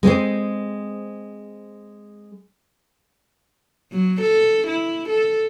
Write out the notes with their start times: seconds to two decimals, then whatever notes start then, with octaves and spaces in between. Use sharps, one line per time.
0.03 G#3 C4 G#4 C5
3.92 F#3
4.22 A4
4.67 E4
5.09 A4